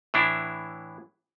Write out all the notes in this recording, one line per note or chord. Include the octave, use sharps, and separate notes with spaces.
A2 E3 D4 E4